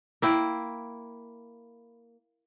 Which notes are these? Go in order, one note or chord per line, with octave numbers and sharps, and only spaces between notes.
A#3 E4 G5